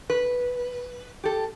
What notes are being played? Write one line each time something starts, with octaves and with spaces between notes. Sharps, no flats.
B4
G4 A4